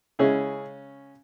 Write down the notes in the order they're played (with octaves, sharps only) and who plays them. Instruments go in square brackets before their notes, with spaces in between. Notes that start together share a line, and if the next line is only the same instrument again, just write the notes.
[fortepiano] C#3 G#3 C#4 E4 G#4